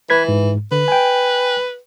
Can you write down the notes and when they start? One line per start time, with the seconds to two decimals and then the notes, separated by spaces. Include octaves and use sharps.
0.10 E3 B4 G#6 B6
0.28 G#2
0.72 D3 B4
0.88 G5 G#5